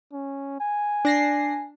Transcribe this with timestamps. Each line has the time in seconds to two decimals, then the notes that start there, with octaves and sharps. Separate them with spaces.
0.13 C#4
0.61 G#5
1.05 D4 A#6 C7